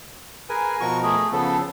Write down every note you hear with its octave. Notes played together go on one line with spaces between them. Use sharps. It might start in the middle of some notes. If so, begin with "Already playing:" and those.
G#4 A#4 B4 G#5
B2 F3 F#4 A#4 C#6
A3 G#4
C#3 F3 B3 A4